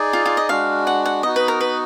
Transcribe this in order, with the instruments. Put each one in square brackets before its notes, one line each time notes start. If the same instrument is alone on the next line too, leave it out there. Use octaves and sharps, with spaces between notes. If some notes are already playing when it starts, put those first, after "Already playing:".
Already playing: [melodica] D#4 G#4 D5
[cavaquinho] F4
F4
D#5
[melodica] G#3 D4 F#4 [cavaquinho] F5
[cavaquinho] F#5
F#5
[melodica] B3 D#4 F#4 [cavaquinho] D#5
[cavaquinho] B4
A#4
B4